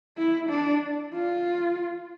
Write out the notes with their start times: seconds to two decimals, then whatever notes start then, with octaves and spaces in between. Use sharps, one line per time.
0.18 E4
0.50 D4
1.13 F4